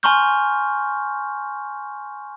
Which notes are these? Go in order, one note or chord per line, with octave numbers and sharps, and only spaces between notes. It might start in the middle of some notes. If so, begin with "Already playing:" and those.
G#5 A#5 C6 C#6 F6 G6